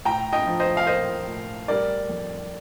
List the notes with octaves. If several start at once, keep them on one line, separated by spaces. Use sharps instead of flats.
A2 G5 A#5
D#5 G5
F3
C5 D#5
F5
A#3 C5 D#5
A2
G3 A#4 D5
F2